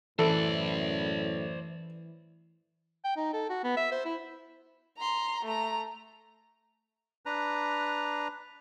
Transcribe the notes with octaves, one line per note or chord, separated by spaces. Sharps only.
F#2 A2 E3 A4 C5 D5
G5
D#4
A4
F#4
B3
E5
C5
E4
A#5 C6
A3 A#5
D4 B4 A#5